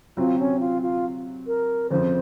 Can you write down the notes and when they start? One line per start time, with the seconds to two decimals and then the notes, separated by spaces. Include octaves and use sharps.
0.17 C3 F#3 C4 F4
0.39 C#4
0.60 F4
0.82 F4
1.47 A#4
1.90 F2 C#3 F3 C5